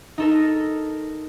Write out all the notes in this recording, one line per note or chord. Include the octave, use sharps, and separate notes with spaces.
D#4 A4 A#4